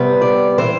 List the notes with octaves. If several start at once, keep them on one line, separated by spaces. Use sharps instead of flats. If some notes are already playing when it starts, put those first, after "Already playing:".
Already playing: C3 G3 B3
D5
C3 E3 C5